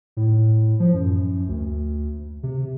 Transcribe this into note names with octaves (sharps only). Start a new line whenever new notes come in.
A2
F3
F#2
D2
C3